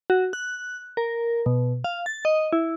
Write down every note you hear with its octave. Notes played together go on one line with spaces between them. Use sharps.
F#4
F#6
A#4
B2
F5
A6
D#5
E4